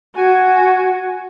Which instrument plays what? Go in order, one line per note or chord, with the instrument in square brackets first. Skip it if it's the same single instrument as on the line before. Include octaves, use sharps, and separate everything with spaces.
[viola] F#4 [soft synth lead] G#5